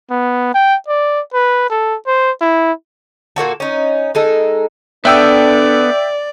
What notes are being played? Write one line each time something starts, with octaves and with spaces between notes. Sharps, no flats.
B3
G5
D5
B4
A4
C5
E4
A#2 A#3 F#4 A4
C#4 D#4
G#3 D#4 A4
B3 D4 A4 D5 E5 G5 E6